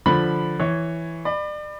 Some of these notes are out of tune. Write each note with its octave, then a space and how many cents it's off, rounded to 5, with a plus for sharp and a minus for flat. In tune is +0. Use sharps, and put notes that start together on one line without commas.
D3 +5 F3 +0 B5 +0
E3 +0 C#5 +0
D5 +35 B5 +10